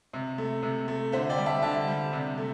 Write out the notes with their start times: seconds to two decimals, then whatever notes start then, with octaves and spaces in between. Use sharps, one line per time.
0.13 C3
0.38 A3
0.63 C3
0.88 A3
1.12 D3 C5 E5
1.29 D5 G5
1.38 G3
1.46 E5 A5
1.62 D3 E5 A5
1.88 G3
2.13 C3
2.38 A3